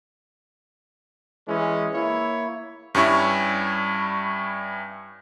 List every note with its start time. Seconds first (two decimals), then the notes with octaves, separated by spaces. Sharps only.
1.48 E3 G#3 C#4
1.94 A#3 E4 C#5
2.95 G2 G3 C#4 E4 C#6